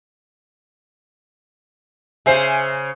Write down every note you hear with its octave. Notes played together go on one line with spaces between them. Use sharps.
C#3 C5 E5 G#5 C7